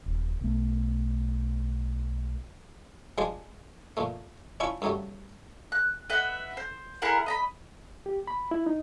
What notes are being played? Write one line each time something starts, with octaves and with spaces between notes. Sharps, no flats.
D#1
B1 A3
F3 G#3 D4 G#4 C5 D5
A#2 F3 A3
C#4 D4 E4 F4 E5 C#6
F#2 C#3 F#3 G3 A3
F#6
B4 D#5 E5 F#5
C5
E4 G#4 A#4 F#5
D#5 A#5 B5
G4
B5
E4
D#4